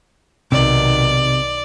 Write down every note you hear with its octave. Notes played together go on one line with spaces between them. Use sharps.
B1 C3 D#3 D5